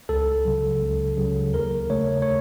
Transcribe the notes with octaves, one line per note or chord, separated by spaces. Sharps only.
C#2 A4
C#3 F#3
C#2
C#3 F#3
D#2 A#4
C#3 A3 C#5
C#5